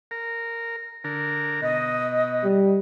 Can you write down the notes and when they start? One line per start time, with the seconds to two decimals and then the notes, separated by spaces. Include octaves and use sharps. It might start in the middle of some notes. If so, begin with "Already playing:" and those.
0.11 A#4
1.04 D3 A#4
1.62 B2 D#5
2.44 G3